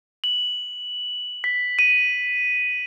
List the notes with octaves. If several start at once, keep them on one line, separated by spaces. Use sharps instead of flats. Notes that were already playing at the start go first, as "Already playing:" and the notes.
F#7
B6
D#7